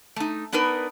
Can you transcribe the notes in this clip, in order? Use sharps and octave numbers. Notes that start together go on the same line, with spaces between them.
A3 D#4
B3 D4 D#4 A#4 B4